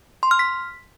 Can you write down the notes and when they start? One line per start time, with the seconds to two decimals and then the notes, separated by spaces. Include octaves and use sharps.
0.23 C6
0.31 F6
0.39 B6